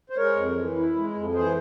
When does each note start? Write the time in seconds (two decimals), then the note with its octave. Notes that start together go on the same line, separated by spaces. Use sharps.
0.10 C5
0.17 G#3 A#4 C#5
0.36 F2
0.56 E3
0.76 E4
0.96 G#3
1.14 F2
1.35 E3 G#4 C5